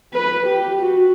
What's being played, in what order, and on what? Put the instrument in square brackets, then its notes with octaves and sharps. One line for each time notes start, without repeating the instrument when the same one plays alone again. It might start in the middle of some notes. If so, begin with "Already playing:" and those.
[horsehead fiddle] B4
G4
F#4